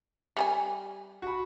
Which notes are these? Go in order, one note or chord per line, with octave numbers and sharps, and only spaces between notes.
G3 G#4 G#5
F#4 B5